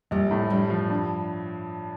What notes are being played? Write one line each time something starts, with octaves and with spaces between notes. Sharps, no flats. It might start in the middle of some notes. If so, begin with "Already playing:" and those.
A#1 G3
A2
G2 G3
F3
G2